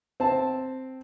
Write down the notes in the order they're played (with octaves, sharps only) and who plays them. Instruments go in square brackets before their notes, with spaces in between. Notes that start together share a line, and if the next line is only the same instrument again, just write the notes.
[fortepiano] C4 A5